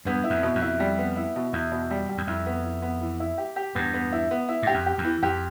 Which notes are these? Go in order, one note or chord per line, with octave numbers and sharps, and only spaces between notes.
E2 G2 B3
E4
F2
B2
F2
E4
G3
B3
E4
B2
E2 E4
B2
G3
G3
E2
F2 E4
B3
E4
B3
E3
E4
G4
G4
E2 G2 B3
B3
E4
B3
E4
G2 G4
F2
G4
E2
E3
F2 G4